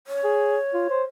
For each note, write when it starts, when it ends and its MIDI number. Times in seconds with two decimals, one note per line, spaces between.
0.07 1.01 73
0.24 0.57 68
0.74 0.85 65
0.90 1.04 72